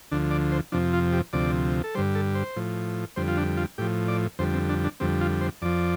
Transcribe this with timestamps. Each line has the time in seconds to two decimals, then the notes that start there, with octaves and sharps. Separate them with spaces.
0.12 D2 D3 F3 D4
0.31 D5
0.52 C5
0.72 F2 C3 F3 D4
0.93 F4
1.13 G4
1.33 D2 C3 F3 D5
1.84 A4
1.95 G2 D3 G3 C5
2.15 A4
2.35 C5
2.56 A2 F3
3.16 F2 D3 G3 C5
3.28 F4
3.37 D4
3.57 F4
3.78 A2 F3 G4
4.08 D5
4.39 F2 D3 G3 C5
4.54 C4
4.69 D4
4.84 D4
5.00 F2 D3 G3 C4
5.21 F4
5.41 C5
5.62 F2 F3 D5